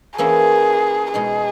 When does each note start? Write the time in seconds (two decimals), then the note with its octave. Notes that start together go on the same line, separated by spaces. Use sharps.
0.18 E3 A#3 C#4 E4 G#4
1.14 B2 G#3 D#4 G#4